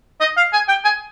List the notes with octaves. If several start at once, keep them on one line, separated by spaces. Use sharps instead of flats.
D#5
F5
G#5
G5
G#5